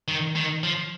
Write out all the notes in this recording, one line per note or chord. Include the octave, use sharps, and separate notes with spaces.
D#3
D#3
F3